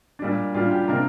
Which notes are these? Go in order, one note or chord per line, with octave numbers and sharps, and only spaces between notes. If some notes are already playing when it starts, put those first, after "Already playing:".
A#2 G3 D4
A#2 G3 D4 F4
G4
C3 A#3 D4 A#4